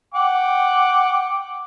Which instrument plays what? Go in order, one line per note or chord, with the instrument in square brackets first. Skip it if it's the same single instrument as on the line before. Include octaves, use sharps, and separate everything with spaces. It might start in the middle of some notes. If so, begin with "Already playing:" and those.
[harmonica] F#5 G5 D6